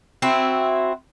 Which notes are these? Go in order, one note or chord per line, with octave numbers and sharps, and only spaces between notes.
C4 E4 F#4